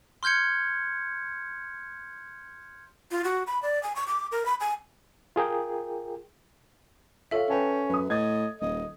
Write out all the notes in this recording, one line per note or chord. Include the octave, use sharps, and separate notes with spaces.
C6 F6 G6 G#6 C#7
F4
F#4
B5
D5
G#5
C#6
D6
A#4
B5
G#5
F4 G#4 A#4 G5
F4 A4 C#5 E5 F5
C#4 B4 G5 A5
F#2 B4 D#6
A2 D#5 G#6 A6
D#1 D#5